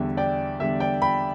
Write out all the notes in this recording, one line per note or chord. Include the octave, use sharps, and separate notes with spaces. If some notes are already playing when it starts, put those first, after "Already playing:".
Already playing: E2 D3 G3 E5
D5 G5
E2 D3 G3 E5
D5 G5
G5 B5